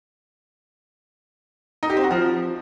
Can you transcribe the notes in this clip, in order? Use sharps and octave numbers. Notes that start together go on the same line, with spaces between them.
D#4
G4
C4
F#4
F3